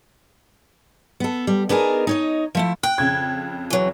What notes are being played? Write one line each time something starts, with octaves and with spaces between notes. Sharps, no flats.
B3 A4
G3
B3 D4 D#4 G#4 A#4
D#4 C#5 D#5
F3 A3 E4
G5 F#6
F2 C#3 G#6
E3 F#3